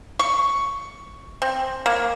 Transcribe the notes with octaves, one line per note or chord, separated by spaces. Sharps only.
C#6
C4
A#3